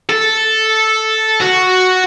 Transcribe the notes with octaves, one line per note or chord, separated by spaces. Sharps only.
A4
F#4